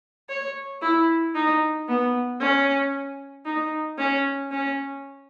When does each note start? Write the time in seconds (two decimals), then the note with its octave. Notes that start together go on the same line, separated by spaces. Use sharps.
0.29 C#5
0.82 E4
1.35 D#4
1.88 B3
2.41 C#4
3.46 D#4
3.98 C#4
4.52 C#4